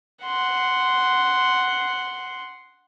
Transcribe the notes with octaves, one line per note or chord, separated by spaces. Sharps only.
F#5 C6